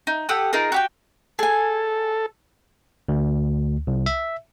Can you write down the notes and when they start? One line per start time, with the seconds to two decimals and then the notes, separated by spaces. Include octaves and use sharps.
0.07 D#4
0.29 G4 A4 F#5 D#6
0.53 D#4 F4 G#4 A#4
0.72 F#4 G4 G5
1.39 G#4 A4 G#5
3.08 D2
3.87 C2
4.06 E5